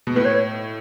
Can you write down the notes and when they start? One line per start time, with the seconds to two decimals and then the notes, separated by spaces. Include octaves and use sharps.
0.07 B2
0.16 A2 B4
0.25 C#5